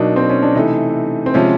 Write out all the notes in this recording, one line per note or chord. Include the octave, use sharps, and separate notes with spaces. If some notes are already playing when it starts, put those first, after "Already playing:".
Already playing: B2 F#3 A#3 D4 D#4
C4
C#4
D4
C3 E3 A3 D#4
C4
C3 F3 G#3 C#4